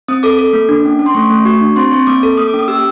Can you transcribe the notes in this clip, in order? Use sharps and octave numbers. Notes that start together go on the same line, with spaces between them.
C4 D#6
A4 D6
A4
A#3
D4
C#4
C#4
C6
A3 C#6
A3
F#4 C#6
D4
C4 C6
C4 C#6
A#3 D6
A4
A#3 D#6
D6
C#4
D#6
G4 E6